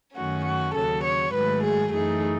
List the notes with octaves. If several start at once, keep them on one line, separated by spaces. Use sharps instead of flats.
F#2 D#3 A3 C#4 F#4
F#4
D#2 C#3 F#3 A4
C#5
G#2 D#3 F#3 A3 B4
G#4
F#2 E3 A3 D#4 G#4